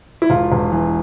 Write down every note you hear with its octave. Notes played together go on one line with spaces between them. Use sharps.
E4
E1 F4
E1
E3